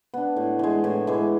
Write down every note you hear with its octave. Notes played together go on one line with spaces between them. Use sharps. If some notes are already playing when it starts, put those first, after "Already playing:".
B3 D4
A2
E3 G#3
A2
E3 G#3